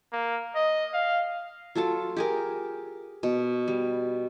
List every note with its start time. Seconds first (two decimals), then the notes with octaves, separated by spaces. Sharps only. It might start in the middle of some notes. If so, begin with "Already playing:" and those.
0.13 A#3
0.55 D#5
0.94 F5
1.75 F#3 F4 A4 A5
2.17 G4 G#4 A#4
3.23 B2
3.68 G3